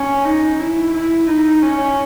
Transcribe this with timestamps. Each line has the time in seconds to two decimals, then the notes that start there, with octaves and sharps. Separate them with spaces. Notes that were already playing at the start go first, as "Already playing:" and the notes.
Already playing: C#4
0.25 D#4
0.60 E4
0.93 E4
1.27 D#4
1.62 C#4